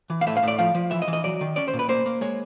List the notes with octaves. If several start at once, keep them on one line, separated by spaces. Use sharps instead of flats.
E3
F5
A2 E5
F5
A2 D5
F3 F5
F3
E3 E5
D#5
E3
D#5
F#3 D5
D#3
C#4 D5
C5
A#2
B4
A#3 C5
A#3
G#3 C#5